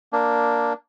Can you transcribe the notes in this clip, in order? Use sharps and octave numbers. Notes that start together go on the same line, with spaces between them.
A#3 D4